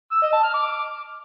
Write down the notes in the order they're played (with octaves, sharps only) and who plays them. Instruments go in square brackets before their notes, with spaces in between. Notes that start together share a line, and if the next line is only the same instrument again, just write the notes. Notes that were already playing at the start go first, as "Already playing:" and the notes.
[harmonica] E6
D#5
A5
F6
D6